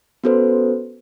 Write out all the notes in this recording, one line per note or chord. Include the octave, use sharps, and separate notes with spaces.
B3 C#4 F#4 A4 B4 C5